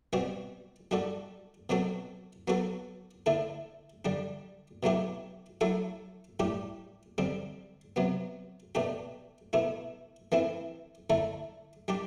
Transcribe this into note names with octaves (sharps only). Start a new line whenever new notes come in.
B2 G3 C4 F#4
G3 D4 F#4 A4
B2 F#3 C4 F#4 A4
F#3 B3 F#4 A4
D3 A3 E4 A4
D3 G3 D4
B2 F#3 A3 E4 G4
F#3 A3 E4 A4
A2 G3 D4 G4
D3 G3 C4
C3 F#3 B3
B2 A3 D4 G4
B2 A3 E4
E3 A3 C4 E4
D3 A3 E4 A4
G3 D4 G4